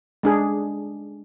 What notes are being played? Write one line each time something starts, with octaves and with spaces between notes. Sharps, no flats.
G#3 D4 G#4